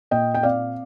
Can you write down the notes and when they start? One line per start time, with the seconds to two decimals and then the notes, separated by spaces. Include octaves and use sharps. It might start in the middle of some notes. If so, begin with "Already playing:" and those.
0.11 A#2 D#5 G5
0.34 G5
0.43 C4 D5 F5